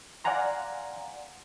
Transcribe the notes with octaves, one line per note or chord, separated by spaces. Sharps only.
D5 F5 F#5 G#5 A#5 C6